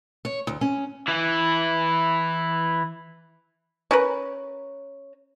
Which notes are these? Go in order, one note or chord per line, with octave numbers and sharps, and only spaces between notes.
C#5
D2
C#4
E3 E4
C#4 A#4 B4